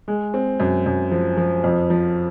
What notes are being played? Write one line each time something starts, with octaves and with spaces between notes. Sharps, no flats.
G#3
C4
F#2
F#2
F3
F3
F2
F3